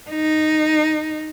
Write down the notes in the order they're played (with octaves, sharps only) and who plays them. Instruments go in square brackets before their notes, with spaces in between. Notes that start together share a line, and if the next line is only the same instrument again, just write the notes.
[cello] D#4